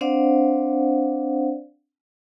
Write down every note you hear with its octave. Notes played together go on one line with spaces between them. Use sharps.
C4 D4 C5 D5 F5 F#5